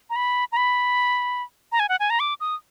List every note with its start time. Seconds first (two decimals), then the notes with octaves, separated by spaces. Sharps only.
0.10 A#5
0.16 B5
0.52 A#5
0.57 B5
1.72 A#5
1.80 G#5
1.89 F#5
2.00 G#5
2.10 A#5
2.20 D6
2.40 D#6